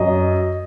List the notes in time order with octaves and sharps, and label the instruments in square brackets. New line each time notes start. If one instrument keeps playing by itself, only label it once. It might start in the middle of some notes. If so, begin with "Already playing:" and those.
Already playing: [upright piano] F#2 F#3 D#5